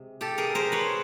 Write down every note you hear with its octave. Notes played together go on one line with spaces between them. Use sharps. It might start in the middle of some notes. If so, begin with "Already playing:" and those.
Already playing: C3 G#3
G4 A4
G#4 A#4
A#4 C5
B4 C#5